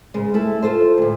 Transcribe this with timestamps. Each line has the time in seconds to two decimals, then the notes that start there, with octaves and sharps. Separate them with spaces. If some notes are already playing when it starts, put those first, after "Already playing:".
0.14 G#2 C#3 G#3
0.34 A3 E4 A4
0.62 F4 A4 C5
0.98 D2 A2